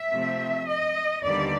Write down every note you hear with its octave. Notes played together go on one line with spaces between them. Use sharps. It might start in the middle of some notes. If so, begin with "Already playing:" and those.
Already playing: E5
C3 F3 A3 C4
D#5
D#2 D3 G3 B3 D5